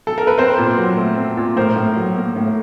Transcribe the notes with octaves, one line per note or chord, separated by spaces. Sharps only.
A4
A#4
B4
C4 A#4 C5
A#2
F#3
A3
C4
A#2
A2 A#4 C5
A2
F#3
A#3
A2